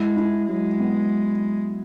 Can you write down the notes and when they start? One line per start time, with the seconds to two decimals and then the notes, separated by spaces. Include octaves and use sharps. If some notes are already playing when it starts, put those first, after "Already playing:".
Already playing: G#3 E4
0.17 E4
0.48 F#3 G#3
0.80 B3